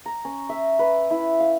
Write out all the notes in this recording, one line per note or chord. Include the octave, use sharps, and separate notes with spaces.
A#5
C#4
E5
B4
E4
F5